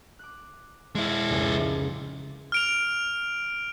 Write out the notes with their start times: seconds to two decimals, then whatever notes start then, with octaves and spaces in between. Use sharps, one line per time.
0.19 D6 F#6
0.95 G#3 E4
1.29 F1 C#2 A#2
2.52 F6 D7 F7